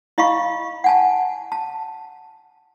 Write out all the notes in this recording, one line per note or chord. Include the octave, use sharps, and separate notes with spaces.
E4 D#5 F5 B5 C#6
F#5 G#5 A5
A5